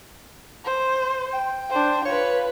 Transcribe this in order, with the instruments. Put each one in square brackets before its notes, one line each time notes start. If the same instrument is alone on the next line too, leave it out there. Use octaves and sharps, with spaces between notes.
[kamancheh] C5
[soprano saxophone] G5
[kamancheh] D4 C5
[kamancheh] F4 B4 [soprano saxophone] C#5